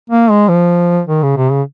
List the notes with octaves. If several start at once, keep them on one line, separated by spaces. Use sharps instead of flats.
A#3
G#3
F3
D#3
C#3
C3
C#3